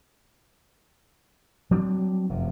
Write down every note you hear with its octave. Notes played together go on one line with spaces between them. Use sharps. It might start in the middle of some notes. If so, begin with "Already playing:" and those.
F#3 G3 C4 D4
F1 F#2 C3